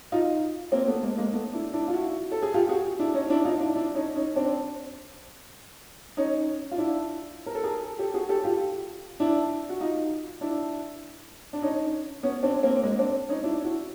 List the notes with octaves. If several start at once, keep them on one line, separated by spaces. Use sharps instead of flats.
D#4 F4
A#3 C4
A3 B3
G#3 A#3
G#3 A#3
A3 B3
D4 E4
D4 E4
F4
E4 F#4
A4
G#4
F4 G4
F#4 G#4
D4 E4
C#4 D#4
D4 E4
D#4 F4
D4 E4
D4 E4
C#4 D#4
C#4 D#4
C4 D4
C#4 D#4
F4
D4 E4
A#4
A4
G#4 A#4
G4 A4
F#4 G#4
G4 A4
F4 G4
D4 E4
F#4
D#4 F4
D4 E4
D4
C#4 D#4
B3 C#4
C4 D4
A#3 C4
G#3 A#3
C4 D4
C#4 D#4
D4 E4
E4 F#4